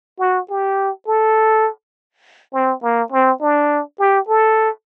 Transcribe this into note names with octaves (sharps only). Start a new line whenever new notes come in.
F#4
G4
A4
C4
A#3
C4
D4
G4
A4